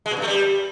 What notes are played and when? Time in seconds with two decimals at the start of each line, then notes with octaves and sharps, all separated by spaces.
0.06 G#3
0.11 B2
0.17 G2
0.22 A3
0.28 G3